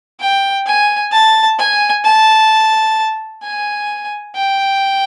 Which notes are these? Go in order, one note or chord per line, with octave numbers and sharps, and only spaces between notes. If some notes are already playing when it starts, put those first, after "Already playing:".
G5
G#5
A5
G#5
A5
G#5
G5